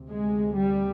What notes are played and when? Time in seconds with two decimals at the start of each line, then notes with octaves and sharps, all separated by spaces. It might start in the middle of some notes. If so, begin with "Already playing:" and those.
Already playing: D2 C3
0.12 G#3
0.58 G3